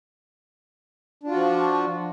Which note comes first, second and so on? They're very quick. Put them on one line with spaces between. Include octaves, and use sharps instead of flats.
D4 F4 F#4 F3